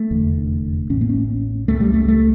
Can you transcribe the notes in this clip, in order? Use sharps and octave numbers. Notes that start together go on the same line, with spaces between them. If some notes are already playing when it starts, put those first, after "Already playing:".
Already playing: A3
F1 E2 D3
A1 A2 C#4
A#3
C#4
C#2 C#3 A3
G3
A3
A3